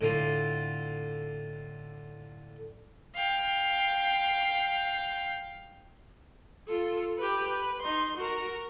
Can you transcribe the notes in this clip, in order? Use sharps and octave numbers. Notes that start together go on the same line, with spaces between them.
A2 D3 F4
F5 G5
F4 A4
G4 B4
B4
D#4 C6
F#4 A#4